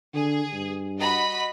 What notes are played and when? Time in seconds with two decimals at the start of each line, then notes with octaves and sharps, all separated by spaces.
0.15 D3 G#4
0.53 G2
0.98 F#4 D#5 B5